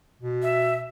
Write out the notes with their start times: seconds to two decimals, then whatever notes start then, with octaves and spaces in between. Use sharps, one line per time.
0.22 B2
0.42 E5